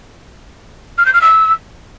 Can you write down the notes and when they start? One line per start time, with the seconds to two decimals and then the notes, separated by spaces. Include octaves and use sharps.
0.98 F6
1.05 G6
1.13 F6
1.21 E6